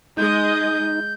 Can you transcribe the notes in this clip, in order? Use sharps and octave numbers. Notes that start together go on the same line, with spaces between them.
G#3 D#4 D#5 G6